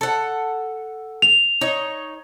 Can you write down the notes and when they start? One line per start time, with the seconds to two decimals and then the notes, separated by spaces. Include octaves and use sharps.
0.01 A4 F#5
1.22 F7
1.61 D#4 C#5